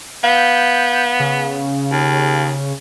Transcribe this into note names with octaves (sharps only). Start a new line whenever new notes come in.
B3 F5 G6
C#3
D#2